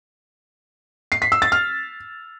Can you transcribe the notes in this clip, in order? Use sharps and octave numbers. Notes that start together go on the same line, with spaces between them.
C7
B6
E6
A6
F6